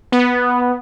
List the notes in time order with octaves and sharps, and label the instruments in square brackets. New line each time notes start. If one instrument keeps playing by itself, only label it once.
[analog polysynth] B3